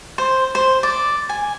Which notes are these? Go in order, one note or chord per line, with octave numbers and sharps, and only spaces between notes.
C5
C5
D5
G#5